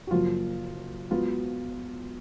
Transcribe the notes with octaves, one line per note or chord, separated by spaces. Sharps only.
F#4
F#1 F#2 F3 A#3 F4
G#2 F#3 B3 F4